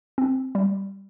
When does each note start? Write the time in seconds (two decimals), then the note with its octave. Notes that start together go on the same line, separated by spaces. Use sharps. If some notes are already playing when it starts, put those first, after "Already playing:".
0.18 C4
0.55 G3